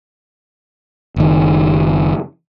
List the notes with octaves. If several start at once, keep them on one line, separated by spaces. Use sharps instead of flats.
F#1 D#3